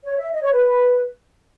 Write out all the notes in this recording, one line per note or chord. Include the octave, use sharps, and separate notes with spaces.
C#5
E5
D#5
C#5
B4